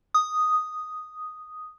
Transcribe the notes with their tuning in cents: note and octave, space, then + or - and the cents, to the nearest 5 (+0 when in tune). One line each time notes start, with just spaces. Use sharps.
D#6 +0